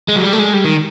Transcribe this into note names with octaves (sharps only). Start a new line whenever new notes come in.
G#3
F#3
G3
A3
G#3
G3
D#3